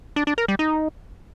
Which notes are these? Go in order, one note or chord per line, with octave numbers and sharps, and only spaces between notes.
D4
D4
A#4
G3
D#4